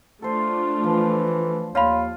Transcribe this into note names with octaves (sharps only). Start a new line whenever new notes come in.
A3 D4 F4 A4 C5
E3 F3
D#2 F4 C#5 F5 B5